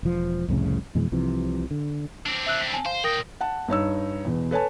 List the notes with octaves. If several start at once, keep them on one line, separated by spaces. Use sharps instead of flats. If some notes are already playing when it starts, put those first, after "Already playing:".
E1 F3
C2 F2 A2 C#3
F2 B2 E3 G#3
C2 C3 E3 F3
D3
C4 D4
E5 E6 F#6
B6
G#5 A5
C5 F5
A#2 A#4 G5 D#6 A#6
F#5 A5
G2 D#4 C#5 E6
E2 B2
A4 B4 C#5 G#5 A5